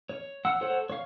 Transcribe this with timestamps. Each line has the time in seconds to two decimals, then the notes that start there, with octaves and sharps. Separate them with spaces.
0.09 C#5
0.45 F#5 E6
0.61 A4 C5 C#5 F#5
0.90 C#5 F5